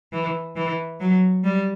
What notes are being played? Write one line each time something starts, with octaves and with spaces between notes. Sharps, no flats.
E3
E3
F#3
G3